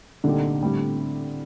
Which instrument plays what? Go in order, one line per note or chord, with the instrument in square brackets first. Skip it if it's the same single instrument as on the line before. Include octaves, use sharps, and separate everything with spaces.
[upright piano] C2 A#2 A3 D#4 G4 [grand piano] D3
[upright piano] A2 G3 C4 G4